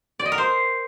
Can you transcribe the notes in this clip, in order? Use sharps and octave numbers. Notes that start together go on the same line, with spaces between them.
D5
D#5
A#4
C5